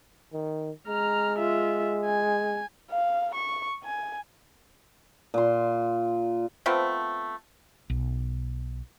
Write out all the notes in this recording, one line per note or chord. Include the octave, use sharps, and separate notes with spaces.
D#3
G#3 A#5 F6
F4 E5
G#5
F5
C#6
G#5
A#2 C6
F3 A3 B3 C4
B1